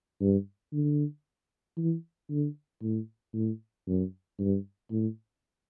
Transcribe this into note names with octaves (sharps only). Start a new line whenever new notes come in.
G2
D3
E3
D3
A2
A2
F#2
G2
A2